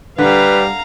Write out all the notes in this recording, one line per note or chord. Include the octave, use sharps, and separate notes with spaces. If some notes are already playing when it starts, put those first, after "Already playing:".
D3 G3 B4 F5 A#5